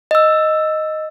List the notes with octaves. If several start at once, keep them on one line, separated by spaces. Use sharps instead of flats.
D#5 E6